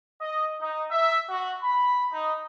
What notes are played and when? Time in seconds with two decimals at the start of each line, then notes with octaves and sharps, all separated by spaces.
0.21 D#5
0.62 D#4
0.91 E5
1.29 F#4
1.62 B5
2.12 D#4